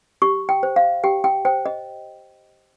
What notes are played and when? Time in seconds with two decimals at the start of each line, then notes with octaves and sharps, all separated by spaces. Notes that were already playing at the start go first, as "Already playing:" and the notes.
0.22 G4 C#6
0.49 G5
0.63 C5
0.76 F5
1.04 G4 G5
1.24 G5
1.45 C5 G5
1.66 D#5